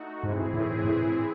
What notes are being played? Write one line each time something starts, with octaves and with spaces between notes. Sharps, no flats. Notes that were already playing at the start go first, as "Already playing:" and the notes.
Already playing: A3 D#4 F#4
G#2 E3 C4 E4 G#4
A2
A2